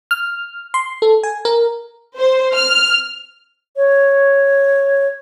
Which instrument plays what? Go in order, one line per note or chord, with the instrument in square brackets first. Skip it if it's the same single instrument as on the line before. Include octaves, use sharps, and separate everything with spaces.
[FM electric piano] F6
C6
A4
G#5
A#4
[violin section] C5
F6
[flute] C#5